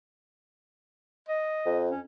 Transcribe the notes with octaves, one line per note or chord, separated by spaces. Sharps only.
D#5
F2
C#4